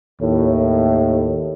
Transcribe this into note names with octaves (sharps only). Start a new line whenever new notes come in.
D#2 A2